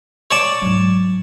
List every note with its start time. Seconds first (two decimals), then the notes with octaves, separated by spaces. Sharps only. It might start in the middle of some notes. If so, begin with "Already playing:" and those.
0.31 C#5 D5 A5
0.62 G#2 F#3